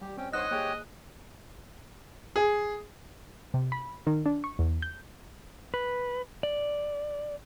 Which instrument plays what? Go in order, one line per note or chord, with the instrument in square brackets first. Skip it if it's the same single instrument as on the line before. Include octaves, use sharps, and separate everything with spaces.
[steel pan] G3 [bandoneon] G4
[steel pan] C4 [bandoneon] C#4 G5
[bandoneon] G2 F#5 [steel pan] D#4 C5 C#5 [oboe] D#5 [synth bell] F#6
[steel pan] A#3 G#4 [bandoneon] G4 C#5 G5
[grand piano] G#4
[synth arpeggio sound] C3
B5
D#3
D4
C#6
E2
G6
[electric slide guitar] B4
D5